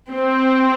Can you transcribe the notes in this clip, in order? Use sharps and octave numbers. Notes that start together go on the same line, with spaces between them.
C4